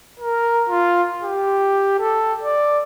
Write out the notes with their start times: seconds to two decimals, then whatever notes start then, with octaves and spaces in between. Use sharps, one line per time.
0.20 A#4
0.69 F4
1.23 G4
2.00 A4
2.43 D5